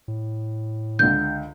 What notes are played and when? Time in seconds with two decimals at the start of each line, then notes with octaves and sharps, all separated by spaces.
0.08 A2
0.99 C#2 D3 G6